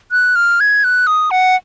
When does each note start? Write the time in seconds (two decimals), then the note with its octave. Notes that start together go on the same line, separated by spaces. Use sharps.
0.12 F#6
0.36 F6
0.60 G#6
0.84 F#6
1.07 D#6
1.31 F#5